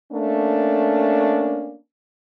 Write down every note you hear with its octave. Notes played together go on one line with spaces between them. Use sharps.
A3 A#3 C#4 D4